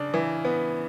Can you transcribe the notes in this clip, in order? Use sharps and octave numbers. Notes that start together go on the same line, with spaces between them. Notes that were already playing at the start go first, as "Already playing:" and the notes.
Already playing: C#3 D4
E3
B3